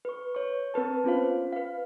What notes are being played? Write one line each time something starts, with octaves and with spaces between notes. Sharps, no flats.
B4 C#6
C#5 C#6
C4 A#4 B4 A5
B3 C#4 F4 C5 F5
B4 F5